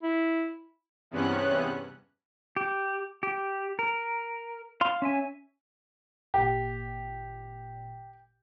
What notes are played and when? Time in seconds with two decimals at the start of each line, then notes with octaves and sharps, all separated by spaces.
0.03 E4
1.11 E2 G2 C3 B3 C#4 F#6
2.56 G4
3.23 G4
3.79 A#4
4.81 F5 C6
5.02 C#4 E5 G#5
6.34 G#1 A#2 G4